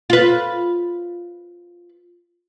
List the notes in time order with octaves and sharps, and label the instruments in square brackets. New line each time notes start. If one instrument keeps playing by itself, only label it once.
[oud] F4 B4